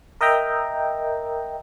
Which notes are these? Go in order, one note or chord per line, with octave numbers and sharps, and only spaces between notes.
A#4 D#5 E5 G5 A#5